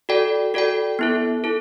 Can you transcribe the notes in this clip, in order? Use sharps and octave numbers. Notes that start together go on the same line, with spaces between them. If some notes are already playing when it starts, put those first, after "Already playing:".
F#4 A4 D5 G5
F#4 A4 D5 G5
B3 E4 A4
E4 A4